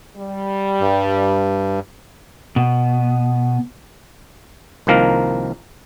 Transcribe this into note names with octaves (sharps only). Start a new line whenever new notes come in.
G3
G2
B2
C2 D#3 F3 A#3 A#4